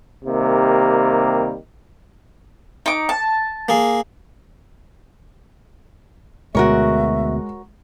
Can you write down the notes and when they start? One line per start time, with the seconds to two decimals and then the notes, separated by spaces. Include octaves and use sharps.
0.24 C3 D#3 G3 A#3
2.86 D#4 D6
3.09 A5
3.69 A#3 G#4
6.55 D2 B2 G#3 F#4 A#4 C#5 E5